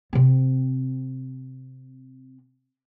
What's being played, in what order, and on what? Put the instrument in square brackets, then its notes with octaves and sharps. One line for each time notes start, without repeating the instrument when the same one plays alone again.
[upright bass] C3 C4